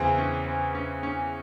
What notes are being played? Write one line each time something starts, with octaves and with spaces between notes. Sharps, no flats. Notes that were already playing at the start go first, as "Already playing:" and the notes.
Already playing: E2 C#3 E3 C4
C#4
C4
C#4
C#4